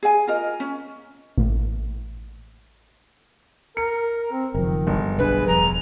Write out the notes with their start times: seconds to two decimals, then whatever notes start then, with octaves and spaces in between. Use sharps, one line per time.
0.03 G#4 G#5
0.27 F4 A#4 D#5
0.60 C#4
1.38 A1 A2
3.77 A#4 C#7
4.32 C4
4.54 F#1 D#3 F3 A#4
4.87 G1
5.18 B1 D4 G#4 B4
5.47 E1 F3 A#5